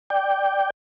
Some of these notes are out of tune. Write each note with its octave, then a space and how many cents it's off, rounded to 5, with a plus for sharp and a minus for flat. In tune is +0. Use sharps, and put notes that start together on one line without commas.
D5 +0 G5 +0